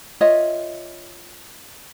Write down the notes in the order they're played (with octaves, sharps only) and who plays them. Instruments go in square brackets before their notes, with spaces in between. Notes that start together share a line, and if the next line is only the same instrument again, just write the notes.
[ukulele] F4 C#5 D#5 E5